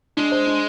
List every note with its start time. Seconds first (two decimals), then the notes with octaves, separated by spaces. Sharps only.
0.17 G#3 D4
0.32 C5
0.47 D4